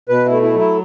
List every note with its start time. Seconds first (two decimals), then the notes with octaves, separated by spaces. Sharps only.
0.09 B2 B4
0.26 E4
0.31 A3
0.42 E4
0.54 F#3
0.59 E4